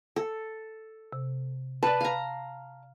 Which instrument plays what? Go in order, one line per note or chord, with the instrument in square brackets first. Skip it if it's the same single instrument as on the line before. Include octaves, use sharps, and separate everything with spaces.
[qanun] A4
[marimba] C3
[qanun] B4 [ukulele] D5 A5
[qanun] F5 A#5